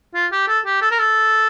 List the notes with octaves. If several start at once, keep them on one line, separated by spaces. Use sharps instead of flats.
F4
G4
A4
G4
A4
A#4
A4